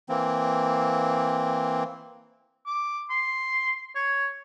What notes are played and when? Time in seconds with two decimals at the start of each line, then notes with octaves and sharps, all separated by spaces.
0.09 E3 A#3 C4
2.66 D6
3.10 C6
3.95 C#5